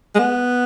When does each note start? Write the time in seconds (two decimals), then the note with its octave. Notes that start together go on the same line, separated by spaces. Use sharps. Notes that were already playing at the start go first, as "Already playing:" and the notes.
0.15 G#3
0.19 B3